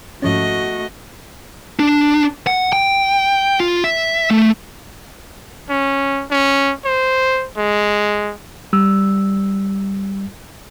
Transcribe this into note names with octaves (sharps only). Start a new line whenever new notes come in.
G#2 F3 A3 C#4 F#4 D#5
D4
F#5
G5
F4
E5
A3
C#4
C#4
C5
G#3
G3 E6